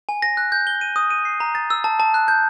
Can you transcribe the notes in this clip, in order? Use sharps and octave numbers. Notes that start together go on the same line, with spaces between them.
G#5
A#6
F#6
G6
G7
D#7
D#6
D#7
C7
A#5
A6
E6
A5
A5
F#6
G6